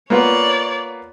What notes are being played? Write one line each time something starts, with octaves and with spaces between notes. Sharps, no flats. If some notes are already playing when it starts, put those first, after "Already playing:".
A#3 B3 F4 C#5 D5